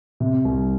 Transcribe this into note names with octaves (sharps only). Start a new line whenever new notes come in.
C3
C2